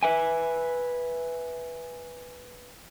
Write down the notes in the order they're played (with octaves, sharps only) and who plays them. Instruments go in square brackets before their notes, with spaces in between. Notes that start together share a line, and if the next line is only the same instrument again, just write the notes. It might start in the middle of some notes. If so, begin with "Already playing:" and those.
[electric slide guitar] B4 E5 G#5